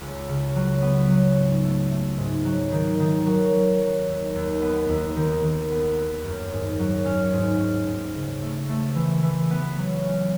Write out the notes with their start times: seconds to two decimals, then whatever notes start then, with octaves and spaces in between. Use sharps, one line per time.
0.01 C#2
0.29 C#3
0.56 F#3
0.82 B3
1.10 F#3
1.37 G#2
1.65 A3
1.91 A3
2.18 G#2
2.45 F#3
2.72 D#3
3.00 D#3
3.26 F#3
3.54 F#3
3.81 F#3
4.08 D#2
4.35 D#2
4.62 B3
4.89 D#2
5.16 D#3
5.44 D#3
5.71 B3
5.98 B3
6.25 F#2
6.52 G#2
6.79 F#3
7.05 C#4
7.33 G#2
7.60 C#4
7.87 G#2
8.15 C#3
8.42 A3
8.69 A3
8.95 E3
9.23 E3
9.51 B3
9.78 F#3
10.04 C#4